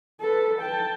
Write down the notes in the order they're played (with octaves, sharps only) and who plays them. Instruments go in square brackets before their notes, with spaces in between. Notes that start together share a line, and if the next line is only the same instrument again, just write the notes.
[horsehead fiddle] A4 B4
G5 A5